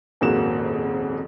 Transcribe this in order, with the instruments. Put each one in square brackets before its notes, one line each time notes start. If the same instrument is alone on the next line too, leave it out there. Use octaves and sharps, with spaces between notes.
[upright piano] D#1 F2 G#2 A#3 F#4 E7